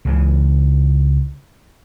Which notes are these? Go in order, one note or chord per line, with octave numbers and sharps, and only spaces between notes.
C#2 C#3 E3